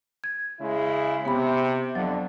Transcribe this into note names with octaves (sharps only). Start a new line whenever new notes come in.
G#6
C#3 G#3 E4
C3 B3 B5
F2 D3 F#3